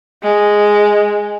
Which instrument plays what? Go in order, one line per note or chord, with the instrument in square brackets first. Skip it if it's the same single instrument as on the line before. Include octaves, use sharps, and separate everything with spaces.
[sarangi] G#3